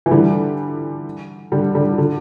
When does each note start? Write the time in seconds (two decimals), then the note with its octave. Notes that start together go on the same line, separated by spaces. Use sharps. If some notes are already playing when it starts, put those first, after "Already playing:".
0.06 E3
0.11 D3 G3
1.52 D3 G3
1.75 D3 G3
1.98 D3